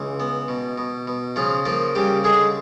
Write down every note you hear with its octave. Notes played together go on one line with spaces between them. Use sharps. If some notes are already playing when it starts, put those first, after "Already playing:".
Already playing: C#2 E3
B3
B2
B2
B2
C#3 F3 F4
F3 A#3 F4
C#3 G3 G4
D3 G#3 G#4